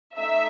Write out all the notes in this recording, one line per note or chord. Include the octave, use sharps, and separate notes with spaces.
A3 D#4 E5